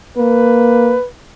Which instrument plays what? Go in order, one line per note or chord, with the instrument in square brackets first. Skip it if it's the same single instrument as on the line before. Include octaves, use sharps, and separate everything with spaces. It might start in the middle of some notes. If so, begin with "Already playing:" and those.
[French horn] A#3 [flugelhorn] B4